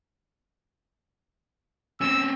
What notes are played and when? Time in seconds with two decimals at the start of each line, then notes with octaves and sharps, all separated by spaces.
2.01 C4 C#4 E6